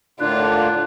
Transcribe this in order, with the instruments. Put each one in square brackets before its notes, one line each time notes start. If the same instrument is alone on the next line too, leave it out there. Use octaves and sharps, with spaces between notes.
[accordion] A2 D3 A#3 [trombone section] D4 [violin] F4 [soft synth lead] F#6